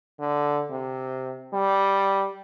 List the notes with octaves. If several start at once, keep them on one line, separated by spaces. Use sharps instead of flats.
D3
C3
G3